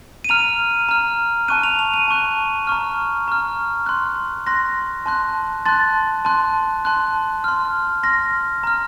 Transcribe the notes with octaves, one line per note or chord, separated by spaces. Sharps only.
D#7
A#5 F6 F7
A#5 F6
A5 C#6 F#6 D#7
F7
F7
D#7
A5 C#6 F#6
A#5 C#6 F6
A#5 C#6 F6
C6 F#6
C6 F#6 A#6
A5 C6 F#6
A5 C6 F#6 A6
A5 C6 F#6
A5 C6 F#6
C6 F6
C6 F6 A#6
A#5 F6